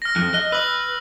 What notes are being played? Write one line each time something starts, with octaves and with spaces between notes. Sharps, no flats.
F6 A#6
F2 F#6
D#5 F#6
B4 E6 F#7